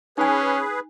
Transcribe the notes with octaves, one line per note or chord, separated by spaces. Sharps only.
C#4 D#4 G#4 B4 G#5